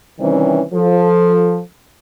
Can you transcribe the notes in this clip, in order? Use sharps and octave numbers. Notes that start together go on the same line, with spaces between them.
C3 D#3 E3 G3 C4 C#4
F3 A4